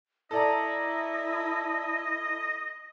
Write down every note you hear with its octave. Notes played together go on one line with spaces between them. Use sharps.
E4 A4 D5 D#5 A#5